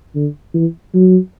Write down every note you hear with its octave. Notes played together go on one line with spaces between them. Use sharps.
D3
E3
F#3